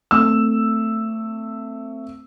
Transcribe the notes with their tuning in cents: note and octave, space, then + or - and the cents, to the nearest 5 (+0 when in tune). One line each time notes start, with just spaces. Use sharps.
A3 +20 C4 +0 E6 +0